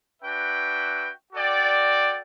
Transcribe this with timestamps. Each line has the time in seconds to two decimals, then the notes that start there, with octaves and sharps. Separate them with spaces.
0.22 D4 F#4 B4 E5 G5
1.33 F#4 A4 D5 G5